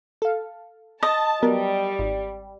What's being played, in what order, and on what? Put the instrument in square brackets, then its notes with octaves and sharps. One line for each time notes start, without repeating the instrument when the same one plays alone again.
[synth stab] A4 F5
[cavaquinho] D#5 [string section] A5
[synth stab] F#3 B3 A#4 [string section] G3
[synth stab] G#1